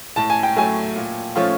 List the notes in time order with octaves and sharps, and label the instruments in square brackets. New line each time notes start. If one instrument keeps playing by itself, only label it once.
[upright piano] A2 [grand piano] A5
[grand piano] G#5
G5
[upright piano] F#3 A3 [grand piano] G#5
[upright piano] A#2
F3 A3 C#4 F4